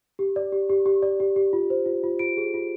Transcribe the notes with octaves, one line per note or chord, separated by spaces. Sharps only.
G4
D5
G4
G4
G4
D5
G4
G4
F4
C5
F4
F4
F4 D7
G#4
F4